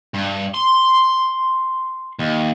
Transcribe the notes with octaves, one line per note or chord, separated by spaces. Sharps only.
G2
C6
D#2